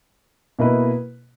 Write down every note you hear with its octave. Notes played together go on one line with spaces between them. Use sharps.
B2 A#3 E4 B4 D#5